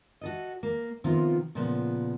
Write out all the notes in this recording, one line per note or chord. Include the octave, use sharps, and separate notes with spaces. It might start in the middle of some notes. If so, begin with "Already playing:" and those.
F#4 A4 D#5
A#3
C3 D#3 F3 B3 F4
A#2 C#3 F3 B3